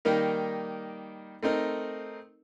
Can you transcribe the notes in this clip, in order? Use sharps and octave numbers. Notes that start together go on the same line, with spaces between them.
D#3 G3 A#3 D#4 A#4
A3 C4 D#4 A#4